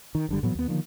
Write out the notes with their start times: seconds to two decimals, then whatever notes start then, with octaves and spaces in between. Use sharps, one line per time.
0.15 D#3
0.29 F#1 D3 G3
0.43 A2 E3 F#3 B3
0.55 D#2 B3
0.68 D3 D#3 F3 A#3